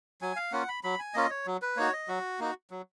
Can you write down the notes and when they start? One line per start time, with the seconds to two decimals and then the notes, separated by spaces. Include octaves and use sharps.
0.22 F#3 G#5
0.36 F5
0.52 A#3 C#4 F4 F#5
0.69 B5
0.84 F#3 B5
0.99 G#5
1.14 A#3 C#4 F4 D#5
1.30 C#5
1.46 F#3
1.62 B4
1.76 A#3 D#4 F#4 C#5
1.93 D#5
2.08 F#3 F#4
2.39 A#3 D#4 F#4
2.71 F#3